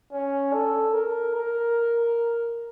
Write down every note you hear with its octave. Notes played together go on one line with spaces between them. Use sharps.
C#4
A4
A#4
A#4